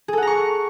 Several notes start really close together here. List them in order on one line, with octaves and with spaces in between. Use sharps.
G#4 A4 F#5 A#5 C#6